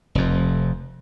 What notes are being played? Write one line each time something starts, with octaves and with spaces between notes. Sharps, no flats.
F1 F2